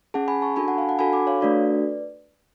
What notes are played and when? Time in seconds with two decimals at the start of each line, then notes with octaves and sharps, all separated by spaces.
0.14 C#4 G#4 F#5 A5
0.28 G#5 B5
0.42 A5 C#6
0.56 D4 F#4 A4 G#5 B5
0.68 F#5 A5
0.78 F5 G#5
0.89 F#5 A5
0.99 D4 F#4 A4 G#5 B5
1.13 B5 D6
1.27 C#5 F5
1.41 A3 D4 F#4 A4 B4 D5